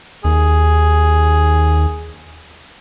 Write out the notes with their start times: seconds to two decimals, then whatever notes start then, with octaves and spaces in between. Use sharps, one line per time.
0.25 D#2 G#4